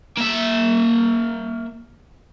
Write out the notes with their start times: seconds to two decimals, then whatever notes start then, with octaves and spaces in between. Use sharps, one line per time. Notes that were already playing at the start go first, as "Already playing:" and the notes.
0.18 A#3 E5